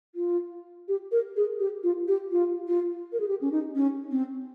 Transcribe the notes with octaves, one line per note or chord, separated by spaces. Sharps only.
F4
G4
A#4
G#4
G4
F4
G4
F4
F4
A#4
G#4
G4
C#4
D#4
C#4
C4